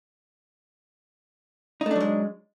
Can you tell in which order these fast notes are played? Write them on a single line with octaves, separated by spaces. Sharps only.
D#4 A3 D4 F#3 G#3